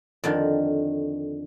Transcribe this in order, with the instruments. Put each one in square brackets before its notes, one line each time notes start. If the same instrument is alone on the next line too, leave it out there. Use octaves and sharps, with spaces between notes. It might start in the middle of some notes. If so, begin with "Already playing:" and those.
[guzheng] F2 D3 D#3